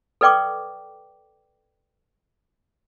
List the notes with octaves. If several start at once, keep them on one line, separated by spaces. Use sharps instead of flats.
A4 B4 D5 G5 C#6 D6